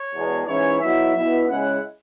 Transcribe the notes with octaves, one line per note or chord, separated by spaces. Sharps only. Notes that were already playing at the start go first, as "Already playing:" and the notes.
Already playing: C#5
E2 B2 G#3
G#2 E3 C#4 E4 C#5
B2 F#3 E4 E5
B2 B3 E4
C#3 G#3 C#4 E4 F#5